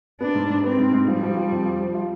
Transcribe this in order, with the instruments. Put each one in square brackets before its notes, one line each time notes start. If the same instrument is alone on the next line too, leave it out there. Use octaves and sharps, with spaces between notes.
[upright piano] B3 [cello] D4
[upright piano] G#2
G#2
[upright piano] B3 [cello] C4
[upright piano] G#2
G#2
[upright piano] F3 [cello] G3
[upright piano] F3
F3
F2
F3
F3
F4